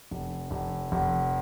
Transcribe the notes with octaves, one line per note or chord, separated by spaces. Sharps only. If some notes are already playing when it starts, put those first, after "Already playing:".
F1
F1
F1